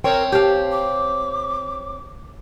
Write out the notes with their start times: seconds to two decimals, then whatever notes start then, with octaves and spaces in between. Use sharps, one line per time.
0.04 C4 A#4 C#5 G5
0.32 G4 F5 A5
0.71 D6